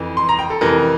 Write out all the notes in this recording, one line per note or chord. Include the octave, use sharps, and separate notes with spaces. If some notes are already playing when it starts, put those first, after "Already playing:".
Already playing: F2 E3
C6
A#5
G5
A4
F2 C3 E3 A#4